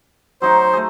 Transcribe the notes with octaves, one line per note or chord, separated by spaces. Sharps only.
F#3 D#4 C5 F#5
A3 G#4